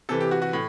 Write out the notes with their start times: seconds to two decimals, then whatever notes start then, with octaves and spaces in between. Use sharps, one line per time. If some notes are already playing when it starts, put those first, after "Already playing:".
0.09 C3 E3 A4
0.20 G4
0.31 F#4
0.42 F#4
0.53 A2